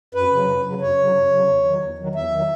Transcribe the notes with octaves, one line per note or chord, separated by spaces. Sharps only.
F#2 B4
C#3 F#3
F#2
C#3 F#3
F#2 C#5
C#3 F#3
F#2
C#3 F#3
E2
D#3 F#3
E2
D#3 F#3
E2 E5
D#3 F#3